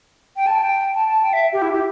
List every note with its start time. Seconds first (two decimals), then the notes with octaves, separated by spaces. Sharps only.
0.36 G5
0.47 A5
0.59 G5
0.94 A5
1.09 A5
1.23 G5
1.33 E5
1.53 G4
1.62 E4
1.72 G4